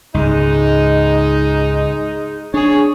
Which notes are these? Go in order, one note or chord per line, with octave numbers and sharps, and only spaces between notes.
C#2 G#2 G#3 D#4
D4 G#4 C#5